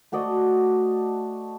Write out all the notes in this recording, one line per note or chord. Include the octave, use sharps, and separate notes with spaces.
A3 F#4 D5 D#5